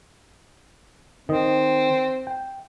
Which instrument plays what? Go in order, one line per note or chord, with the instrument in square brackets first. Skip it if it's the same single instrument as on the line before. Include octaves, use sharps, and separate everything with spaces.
[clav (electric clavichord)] D#3 D#5 [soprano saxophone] C4
[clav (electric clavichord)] G5